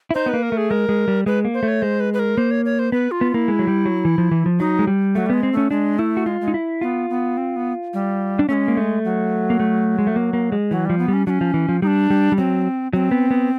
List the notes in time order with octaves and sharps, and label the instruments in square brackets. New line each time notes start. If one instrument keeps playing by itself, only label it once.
[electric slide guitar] E4
[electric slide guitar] D#4 [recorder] C5
[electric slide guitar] B3
[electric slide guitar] A#3 [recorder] B4
[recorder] A#4
[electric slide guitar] A3
[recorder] G#4
[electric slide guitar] G#3 [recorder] A#4
[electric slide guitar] G#3
G3
[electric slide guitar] G#3 [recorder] B4
[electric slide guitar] A#3
[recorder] C5
[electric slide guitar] A3
[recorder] C#5
[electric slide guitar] G#3 [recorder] C5
[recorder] B4
B4
A#4
[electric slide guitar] A#3 [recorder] C5
[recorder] C#5
C#5
C5
[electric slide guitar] B3 [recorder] B4
[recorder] F4
[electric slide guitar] B3
[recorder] F4
[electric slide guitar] A#3 [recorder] E4
[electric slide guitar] G#3
F#3
G3
F#3
E3
F3
E3
F3
[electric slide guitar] F#3 [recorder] D#4
[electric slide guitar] G#3
G3
[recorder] F#3 [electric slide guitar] A3
[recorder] G3
[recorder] G#3 [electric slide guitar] B3
[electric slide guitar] C4
[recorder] A3 [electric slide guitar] C#4
[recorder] G#3 [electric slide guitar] D4
[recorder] A3 [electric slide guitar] E4
[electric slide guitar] F#4
[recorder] G#3 [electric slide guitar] F4
[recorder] G#3
[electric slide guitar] D#4
E4
[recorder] B3 [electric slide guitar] F4
[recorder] B3
C4
B3
G3
[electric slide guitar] D4
[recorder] A3 [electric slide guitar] C#4
[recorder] G#3
[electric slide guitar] A#3
A3
[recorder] F#3
[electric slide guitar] A#3
A3
G#3
A3
A#3
A#3
G#3
[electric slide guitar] E3 [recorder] F#3
[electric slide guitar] F3 [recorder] G3
[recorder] B3
[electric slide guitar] G3
[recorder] C#4
[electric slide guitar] F#3 [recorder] C#4 D4
[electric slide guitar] F3
E3
F3
[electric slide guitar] G3 [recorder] D#4
[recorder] D4
[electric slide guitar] G3
G3
[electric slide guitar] F#3 [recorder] C4
[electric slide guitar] F#3 [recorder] C4
[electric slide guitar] B3
B3